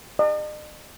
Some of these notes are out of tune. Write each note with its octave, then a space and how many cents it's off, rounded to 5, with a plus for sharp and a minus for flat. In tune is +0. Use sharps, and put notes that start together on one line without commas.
D#5 -45